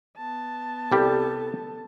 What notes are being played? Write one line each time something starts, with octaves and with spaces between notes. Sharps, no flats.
B3 A5
C2 G3 G4 A4